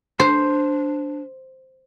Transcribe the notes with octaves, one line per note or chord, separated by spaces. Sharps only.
D4 C5